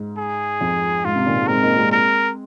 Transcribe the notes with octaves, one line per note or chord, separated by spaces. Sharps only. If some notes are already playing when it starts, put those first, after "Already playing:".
Already playing: G#2
G#4
F2
G#2 F4
G#2 C3
A#2 D#3
D#3 G#3
G#3 C4 A#4
A#3 D#4
G#3 C4
A#4